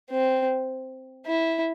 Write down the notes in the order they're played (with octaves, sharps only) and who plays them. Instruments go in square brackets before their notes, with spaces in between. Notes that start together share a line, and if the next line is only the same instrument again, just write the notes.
[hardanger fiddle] C4
E4